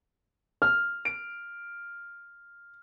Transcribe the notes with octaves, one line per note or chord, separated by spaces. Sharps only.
F6
D7